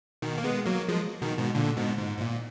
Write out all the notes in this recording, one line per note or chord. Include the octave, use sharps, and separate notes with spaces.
B2 D#3
A#3
G#3 B3
F#3 A#3
F3 G#3
B2 D#3
G#2 B2
A#2 D3
G#2 B2
G#2
G#2
A#2